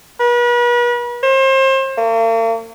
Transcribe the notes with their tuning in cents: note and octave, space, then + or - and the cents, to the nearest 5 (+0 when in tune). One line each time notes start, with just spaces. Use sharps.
B4 -40
C5 +35
A#3 -45